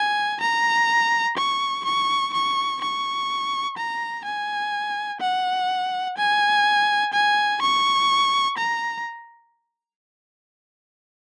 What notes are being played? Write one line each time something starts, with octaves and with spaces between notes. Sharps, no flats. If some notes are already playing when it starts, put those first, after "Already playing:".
Already playing: G#5
A#5
C#6
C#6
C#6
C#6
A#5
G#5
F#5
G#5
G#5
C#6
A#5